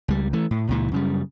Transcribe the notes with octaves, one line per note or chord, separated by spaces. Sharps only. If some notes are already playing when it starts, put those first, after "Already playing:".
C#2 G3
E3 A3
A2
C#2 A#2 E3
F#2 C#3 G3